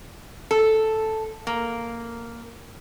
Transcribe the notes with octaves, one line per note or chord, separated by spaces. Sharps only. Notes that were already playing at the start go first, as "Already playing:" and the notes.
A4
A#3